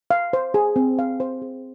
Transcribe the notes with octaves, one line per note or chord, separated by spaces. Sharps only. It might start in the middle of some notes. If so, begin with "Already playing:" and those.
F5
C5
G#4
C4
F5
C5
G#4